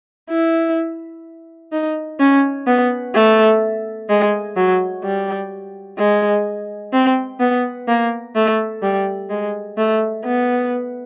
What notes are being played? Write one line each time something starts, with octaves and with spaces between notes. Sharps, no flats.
E4
D#4
C#4
B3
A3
G#3
F#3
G3
G#3
C4
B3
A#3
A3
G3
G#3
A3
B3